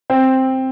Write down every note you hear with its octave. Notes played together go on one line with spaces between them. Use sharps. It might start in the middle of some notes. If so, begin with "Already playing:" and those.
C4